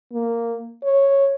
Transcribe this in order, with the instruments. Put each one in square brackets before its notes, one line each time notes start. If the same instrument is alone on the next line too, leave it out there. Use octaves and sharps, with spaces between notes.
[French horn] A#3
C#5